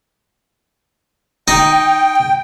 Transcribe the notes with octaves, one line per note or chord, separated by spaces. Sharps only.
D#4 G5